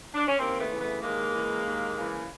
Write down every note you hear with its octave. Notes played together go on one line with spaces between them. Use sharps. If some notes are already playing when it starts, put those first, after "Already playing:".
D4
C#4
D#2 A#3 C4
A3 B3
C#3 E3
A3 B3
D#2 G#3 A#3
C#3 E3
D#2
C#3 E3